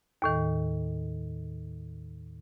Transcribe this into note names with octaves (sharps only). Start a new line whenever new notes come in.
D#2 A2 D#3